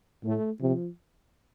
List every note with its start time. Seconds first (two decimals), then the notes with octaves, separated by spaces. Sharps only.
0.24 A2 A3
0.61 C3 F3